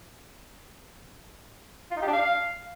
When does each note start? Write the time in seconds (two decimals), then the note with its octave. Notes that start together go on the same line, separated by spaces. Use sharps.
1.91 F4
1.97 D#4
2.02 G4
2.08 D4
2.13 F5